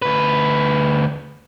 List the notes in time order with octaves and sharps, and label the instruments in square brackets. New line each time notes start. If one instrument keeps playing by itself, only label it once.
[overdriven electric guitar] D2 B4